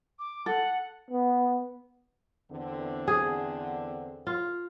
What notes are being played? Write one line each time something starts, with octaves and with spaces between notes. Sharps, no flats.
D6
A4 F#5
B3
E2 D3 C4
G#4
F4